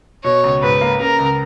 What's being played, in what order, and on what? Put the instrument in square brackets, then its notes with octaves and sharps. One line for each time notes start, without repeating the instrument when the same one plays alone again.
[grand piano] B2 [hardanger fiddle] C#5
[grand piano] C#2
[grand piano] G#2 [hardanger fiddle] B4
[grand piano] A#3
[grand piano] C#3 [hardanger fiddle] A#4
[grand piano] C#2